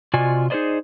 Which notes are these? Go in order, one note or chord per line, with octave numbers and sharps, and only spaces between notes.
C3 F4 F#4 D5 D#5 G#5
D#4 G#4 B4 C5 D5 D#5